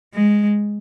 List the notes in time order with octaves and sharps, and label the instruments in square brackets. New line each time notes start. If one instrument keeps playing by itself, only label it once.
[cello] G#3